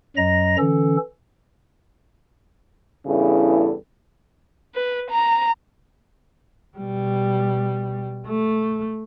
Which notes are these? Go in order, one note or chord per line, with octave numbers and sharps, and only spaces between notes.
F#2 F#3 D#5 A#5 A#6
D3 E3 C#4 A4
E2 G2 C#3 E4 A4
B4
A#5
B2 G3
A3